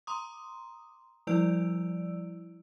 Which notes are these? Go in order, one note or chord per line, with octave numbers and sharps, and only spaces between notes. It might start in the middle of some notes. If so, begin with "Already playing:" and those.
A#5 C6 D6 D#6
F3 G3 E4 D5 E6 D7